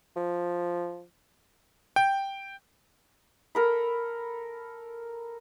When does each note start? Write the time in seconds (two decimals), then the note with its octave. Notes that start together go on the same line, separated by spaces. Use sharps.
0.16 F3
1.96 G5
3.55 A4 A#4 B5